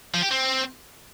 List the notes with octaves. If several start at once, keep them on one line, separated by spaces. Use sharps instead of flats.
F3
G4
C4